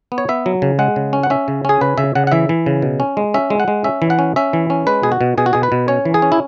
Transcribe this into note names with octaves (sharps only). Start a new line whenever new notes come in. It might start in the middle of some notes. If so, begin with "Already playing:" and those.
B3
C#5
B3 E5
F#3
C#3
G#3 F#5
C#3
C#4
F#5
C#4 E5
C#3
C#4 G#4
C#3 B4
C#3 E5
C#3 F#5
F#5
E3 E5
E3
C#3
B2
C#4
G#3
C#4 E5
G#3
F#5
G#3
C#4 E5
E3
F#5
C#4
C#4 E5
E3
C#4
G#3 B4
B2 G#4
F#4
B2
B2 G#4
F#4
B2 G#4
B4
B2
C#4 C#5
E3
G#4
C#4
E4